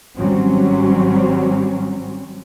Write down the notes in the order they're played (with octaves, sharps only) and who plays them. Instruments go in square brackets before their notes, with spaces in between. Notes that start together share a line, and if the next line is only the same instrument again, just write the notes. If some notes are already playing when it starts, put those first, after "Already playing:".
[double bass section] G#1 F#3 G3 C4 C#4